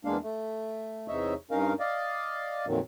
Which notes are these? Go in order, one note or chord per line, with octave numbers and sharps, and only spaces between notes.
E2 G#3 A#3 D4 F5
A3
E2 C3 D#4 C#5 D#5 E5
G2 C#4 D#4 A#4 F5
D5 D#5 F5
F2 A#2 D#3 F#3